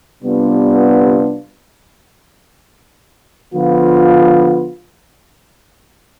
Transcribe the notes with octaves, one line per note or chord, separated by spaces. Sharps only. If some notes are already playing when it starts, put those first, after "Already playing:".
C3 G3 B3 D4 F4
D3 F3 B3 F4